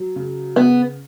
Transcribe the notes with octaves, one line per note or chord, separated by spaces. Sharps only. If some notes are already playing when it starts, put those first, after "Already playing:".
Already playing: F#3
C#3
C#3 B3